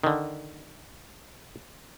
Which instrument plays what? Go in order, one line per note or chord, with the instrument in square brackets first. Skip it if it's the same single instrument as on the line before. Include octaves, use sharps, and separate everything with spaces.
[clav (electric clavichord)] D3 D#3